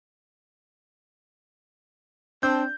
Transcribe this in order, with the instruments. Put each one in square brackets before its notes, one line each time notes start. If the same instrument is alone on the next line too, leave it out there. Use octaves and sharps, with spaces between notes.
[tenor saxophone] C4 [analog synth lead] D4 [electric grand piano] G6